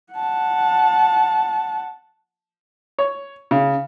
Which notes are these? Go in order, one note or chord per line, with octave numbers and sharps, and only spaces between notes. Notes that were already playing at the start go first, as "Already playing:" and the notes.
F#5 A5
C#5
C#3